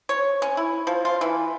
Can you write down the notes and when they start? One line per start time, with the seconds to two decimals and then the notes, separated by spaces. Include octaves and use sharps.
0.09 C#5
0.42 C#4
0.57 E4
0.87 F3
1.05 F4
1.21 E3